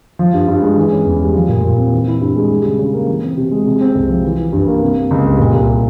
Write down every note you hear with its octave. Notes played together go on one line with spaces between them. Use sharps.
F3
G2
G2
G#3
E3
C#4
E2
G3
F3
A#2
A#2
C4
E3
E4
G2
G#3
G3
C#3
C#3
A#3
E3
C4
C3
G#3
C3
C4
C2
F3
E3
E4
G2
A#3
C3
A#3
C#2
G3
A#2
C2